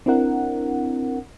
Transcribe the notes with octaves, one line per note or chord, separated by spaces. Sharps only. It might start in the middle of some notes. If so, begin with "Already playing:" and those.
C4 D4 E4 A#4 F#5